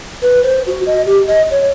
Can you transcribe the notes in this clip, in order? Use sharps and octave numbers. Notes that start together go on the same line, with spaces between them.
B4
C5
F#4
D#5
G4
D#5
C#5